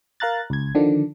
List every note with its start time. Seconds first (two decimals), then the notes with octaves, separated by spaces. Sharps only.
0.20 A#4 F5 A#5 F#6 A6
0.50 C#2 G#6
0.75 D3 D#3 F3 D4